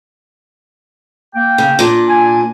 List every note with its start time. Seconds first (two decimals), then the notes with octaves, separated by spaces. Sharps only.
1.35 A#3 G5
1.58 C#3
1.79 A#2 D4
2.08 G#5